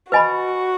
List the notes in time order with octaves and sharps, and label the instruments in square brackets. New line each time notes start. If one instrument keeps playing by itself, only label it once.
[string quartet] F#4 [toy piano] B4 D#5 G#5 B5